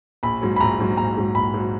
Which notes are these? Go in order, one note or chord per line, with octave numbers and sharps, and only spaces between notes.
A#1 B5
G#2 F#3
B5
A#1 A#5
G#2 F#3
A#1 A#5
G#2 F#3
A#1 B5
G#2 F#3